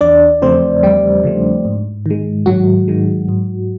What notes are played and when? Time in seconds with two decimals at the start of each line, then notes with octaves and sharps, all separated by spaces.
0.01 E2 D4 D5
0.42 C#3 F3 A3 C4 C5
0.83 E2 G3 G4
1.24 C#3 F3 A3
1.65 G#2
2.06 D#3 G#3
2.46 G#2 F#3 F#4
2.88 D#3 G#3
3.28 G#2